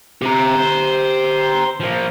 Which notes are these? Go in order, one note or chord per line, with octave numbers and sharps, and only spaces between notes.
C3 G4 A#5
C5
F3 A#3